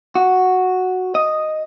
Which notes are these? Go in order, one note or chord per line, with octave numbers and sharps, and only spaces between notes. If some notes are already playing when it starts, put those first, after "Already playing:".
F#4
D#5